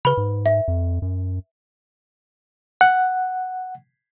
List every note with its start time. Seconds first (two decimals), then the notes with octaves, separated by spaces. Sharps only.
0.05 C#3 B4 B5
0.17 G#2
0.46 E5
0.68 F2
1.02 F#2
2.81 F#5